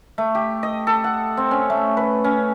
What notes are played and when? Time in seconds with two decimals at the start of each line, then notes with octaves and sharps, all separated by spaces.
0.18 A3
0.35 G4
0.63 D#5
0.87 A4
1.04 F#5
1.37 C4
1.51 C#4
1.70 A3
1.97 B4
2.24 C#4